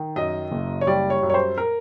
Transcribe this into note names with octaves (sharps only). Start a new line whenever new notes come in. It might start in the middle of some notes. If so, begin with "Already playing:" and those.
Already playing: D#3
F#2 D#5
F#1
C#5
G3 D5
C#5
F#2
C#5
C5
A#4